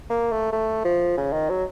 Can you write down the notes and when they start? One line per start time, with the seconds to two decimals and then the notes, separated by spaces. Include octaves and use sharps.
0.10 A#3
0.32 A3
0.53 A3
0.85 F3
1.18 C#3
1.33 D#3
1.50 F#3